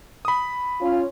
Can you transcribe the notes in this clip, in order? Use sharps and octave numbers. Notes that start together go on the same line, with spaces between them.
B5 D#6
C#4 F4